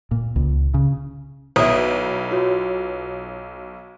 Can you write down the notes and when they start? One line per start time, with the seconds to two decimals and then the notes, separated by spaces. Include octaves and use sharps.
0.11 A#2
0.36 C#2
0.74 C#3
1.56 B1 E4 B4 D#6
2.31 F4 F#4 C#5